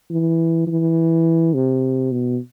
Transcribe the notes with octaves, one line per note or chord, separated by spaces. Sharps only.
E3
E3
C3
B2